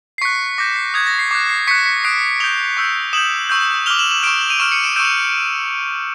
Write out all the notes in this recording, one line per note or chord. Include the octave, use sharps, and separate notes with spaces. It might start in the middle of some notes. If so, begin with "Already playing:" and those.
C7
C#6 F#6 B6 C#7
D6 G6 A#6
C7
D#6 F#6 G#6
A#6
C7
D6 F#6 C7
C7
C#6 F#6 B6 C#7
B6 C#7
D#6 F#6 C7 D7
D#6 G6 F7 G7
C#6 E6 G6
D#6 G6 E7 F#7
C#6 E6 G6
D6 F6 F7 G7
E7 F#7
E7 F#7
C#6 F6 D7 E7
E7 F#7
D#7 F7
C#6 F6 D7 E7
C#7 D#7
D7 E7
C#6 E6 G6 D7 E7
D#7 F7